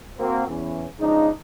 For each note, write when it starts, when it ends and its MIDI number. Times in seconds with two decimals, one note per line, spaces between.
0.18 0.46 58
0.18 0.46 60
0.18 0.46 66
0.48 0.85 40
0.48 0.85 52
0.48 0.85 61
1.00 1.30 49
1.00 1.30 53
1.00 1.30 56
1.00 1.30 62
1.00 1.30 63